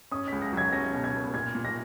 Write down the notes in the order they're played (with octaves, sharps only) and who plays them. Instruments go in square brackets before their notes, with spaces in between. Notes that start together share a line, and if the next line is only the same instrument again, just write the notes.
[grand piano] C#4 [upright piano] D#6
[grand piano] C#2 [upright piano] B6
[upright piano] A#6
[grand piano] F#3 [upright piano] G#6
[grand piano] C#4 [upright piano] A#6
[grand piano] B2
[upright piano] G#6
[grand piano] B2
[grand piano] A#2 [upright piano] G#6
[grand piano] A#2
[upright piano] A#6